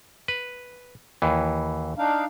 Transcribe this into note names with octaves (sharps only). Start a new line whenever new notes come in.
B4
D#2 E3
D4 D#4 F5